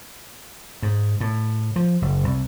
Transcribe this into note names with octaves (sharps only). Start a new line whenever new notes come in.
G#2
A2
F3
F#1
C2